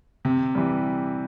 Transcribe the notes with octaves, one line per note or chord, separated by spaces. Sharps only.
C3
E3 G3